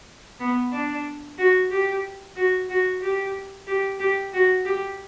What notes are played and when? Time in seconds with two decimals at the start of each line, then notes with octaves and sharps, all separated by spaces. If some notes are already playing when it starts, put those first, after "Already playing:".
0.40 B3
0.72 D4
1.38 F#4
1.70 G4
2.36 F#4
2.69 F#4
3.01 G4
3.67 G4
3.99 G4
4.33 F#4
4.65 G4